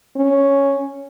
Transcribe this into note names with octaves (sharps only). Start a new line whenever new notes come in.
C#4